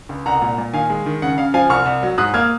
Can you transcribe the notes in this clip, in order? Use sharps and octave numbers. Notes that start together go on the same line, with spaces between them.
C#2
C2 F#5 A#5
A#2
A#2
D#3 F5 G#5
G#3
D#3
C#3 F#5
C#3 F5
F3 F5 G#5
C2 C#6 F6
C2
F#3
G#2 D#6 F#6
A#3 F6 G#6